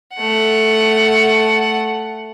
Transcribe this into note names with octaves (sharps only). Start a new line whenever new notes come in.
A3 F#5